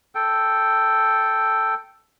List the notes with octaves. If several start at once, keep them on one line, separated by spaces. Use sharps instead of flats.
A4 G5